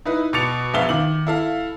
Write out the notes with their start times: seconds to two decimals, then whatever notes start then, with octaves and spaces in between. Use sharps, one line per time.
0.05 D#4 E4 B4
0.33 B2 D6 A6 C#7 F7
0.73 E1 A#1 B3 E5 F5 G7
0.89 D#3 D6 F#7
1.27 E4 A4 F5